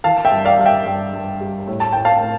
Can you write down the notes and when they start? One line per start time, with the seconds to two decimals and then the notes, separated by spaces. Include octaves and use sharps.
0.04 E3 F5 A5
0.25 E5 G5
0.32 G2
0.45 D5 F5
0.59 G2 F5
0.66 E5 G5
0.86 G2
1.13 G2
1.41 G3
1.67 A2
1.80 A5
1.92 A2 G5
2.05 F5 A5
2.22 A2